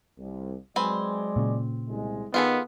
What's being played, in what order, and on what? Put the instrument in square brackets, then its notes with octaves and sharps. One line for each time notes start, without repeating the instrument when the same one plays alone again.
[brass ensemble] C2
[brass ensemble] F#3 G#3 D5 [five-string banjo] C4 B4 G#5
[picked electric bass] A#2 C#3
[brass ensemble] C2 G#3
[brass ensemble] D#3 [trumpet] B3 [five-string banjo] F4 G#4 A4